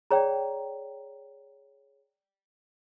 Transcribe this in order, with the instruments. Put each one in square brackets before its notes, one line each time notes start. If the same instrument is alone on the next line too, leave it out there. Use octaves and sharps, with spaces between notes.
[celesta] G#4 C#5 [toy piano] D5 G5 A#5